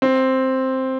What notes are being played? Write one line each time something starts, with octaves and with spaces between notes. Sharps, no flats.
C4